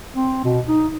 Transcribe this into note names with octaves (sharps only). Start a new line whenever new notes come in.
C4
B2
D#4